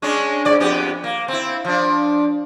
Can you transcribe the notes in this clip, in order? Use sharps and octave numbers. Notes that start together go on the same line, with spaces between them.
G#3 C#4 D4
G#2 D5
F2 B3 G4
A#3
C4 E4
F3 D4